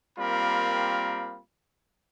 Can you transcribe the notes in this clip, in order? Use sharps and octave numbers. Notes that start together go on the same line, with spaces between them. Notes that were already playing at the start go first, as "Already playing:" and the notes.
G3 A#3 C4 F4 A#4 B5